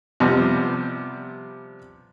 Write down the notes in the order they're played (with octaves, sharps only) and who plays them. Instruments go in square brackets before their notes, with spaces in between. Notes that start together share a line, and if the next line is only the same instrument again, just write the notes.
[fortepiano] C3 F3 G3 B3